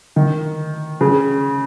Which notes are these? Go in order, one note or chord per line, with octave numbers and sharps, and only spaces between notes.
D#3
C#3